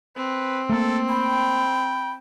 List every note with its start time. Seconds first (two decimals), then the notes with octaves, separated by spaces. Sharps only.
0.17 C4 B4
0.70 A3 A#3 A4
1.09 G5 B5